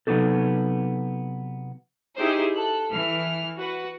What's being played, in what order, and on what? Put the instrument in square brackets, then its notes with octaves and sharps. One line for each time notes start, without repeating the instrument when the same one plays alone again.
[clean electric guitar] C3 F#3 B3 D4 D#4 A4
[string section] D#4 E4 G4 G#4 C5
A4 F#6
E3 F6
F#4 B4 F#5